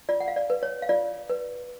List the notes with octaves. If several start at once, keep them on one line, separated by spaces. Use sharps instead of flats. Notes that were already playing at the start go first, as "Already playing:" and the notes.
F4 D5
F#5
F5
D5
B4
C#5
F5
F4 D5
B4